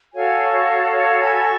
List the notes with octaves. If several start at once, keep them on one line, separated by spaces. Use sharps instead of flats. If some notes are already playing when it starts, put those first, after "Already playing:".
F#4 A4 C#5 F5 G#5
C#5 F5
C#5 F5
G#5 B5
C#6